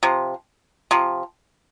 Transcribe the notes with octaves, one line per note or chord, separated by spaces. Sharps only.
C3 F3
C3 F3